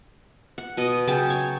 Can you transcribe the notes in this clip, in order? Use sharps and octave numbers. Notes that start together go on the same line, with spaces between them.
F#5
B2 D#5
C#3 F#3 G5 A5
C#5